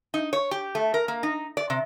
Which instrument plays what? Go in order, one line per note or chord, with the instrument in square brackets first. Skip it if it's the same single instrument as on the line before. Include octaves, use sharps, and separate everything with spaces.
[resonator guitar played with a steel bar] D#4
C#5
G4
A3
A#4
A#3
D#4
D5
C3